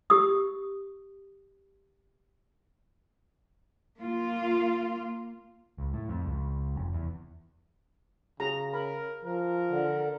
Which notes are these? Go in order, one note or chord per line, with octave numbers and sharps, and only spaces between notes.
G4 D#6
A#3 F4
C#2
A2
F2
C#2
F1
E2
C#3 F#4 G#4 A#5
A#4 B5
F3 A#4
D3